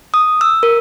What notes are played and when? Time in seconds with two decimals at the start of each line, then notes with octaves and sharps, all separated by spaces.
0.14 D#6
0.41 E6
0.63 A#4